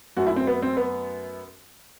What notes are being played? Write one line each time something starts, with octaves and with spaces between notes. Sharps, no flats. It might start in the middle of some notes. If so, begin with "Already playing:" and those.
F#2 F#3 A3 F#4
E4
C4
B3
C4
B3